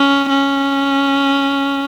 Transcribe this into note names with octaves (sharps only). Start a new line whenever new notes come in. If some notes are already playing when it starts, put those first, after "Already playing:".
Already playing: C#4
C#4